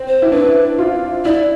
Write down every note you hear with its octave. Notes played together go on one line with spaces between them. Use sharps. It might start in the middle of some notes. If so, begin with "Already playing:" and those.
Already playing: C4
C5
E4
D4 B4
F4
E4 D5